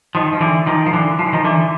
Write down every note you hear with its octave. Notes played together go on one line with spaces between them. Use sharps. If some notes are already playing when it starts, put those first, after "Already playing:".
D#3 F3
F3
D3 E3
D#3 F3
F3
D3 E3
F3
E3
D#3 F3
D3 E3